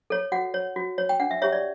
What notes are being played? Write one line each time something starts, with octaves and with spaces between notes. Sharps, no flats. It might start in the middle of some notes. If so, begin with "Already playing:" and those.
A4 C#5
F#4 F#5
C#5
F#4
C#5
G5
D4 F#5
E5
G4 C#5 E5
D5